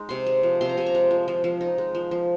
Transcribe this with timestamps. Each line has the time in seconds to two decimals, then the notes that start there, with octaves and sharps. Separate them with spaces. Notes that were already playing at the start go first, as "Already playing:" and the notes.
Already playing: G#3 D#4
0.09 C3 C6
0.26 G#3
0.43 F3
0.61 C3 C6
0.69 A#5
0.77 C3 G#5
0.86 A#5
0.95 G#3
1.11 F3
1.28 F3
1.44 F3
1.61 D#4
1.78 G#3
1.95 F3
2.11 F3